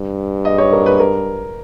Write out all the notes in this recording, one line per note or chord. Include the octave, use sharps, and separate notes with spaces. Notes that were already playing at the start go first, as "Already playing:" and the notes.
Already playing: G2
D#5
C#5
A#4
B4
A#4